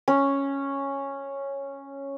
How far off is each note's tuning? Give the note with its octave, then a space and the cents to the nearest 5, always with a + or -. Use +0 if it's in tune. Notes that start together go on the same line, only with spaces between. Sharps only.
C#4 -5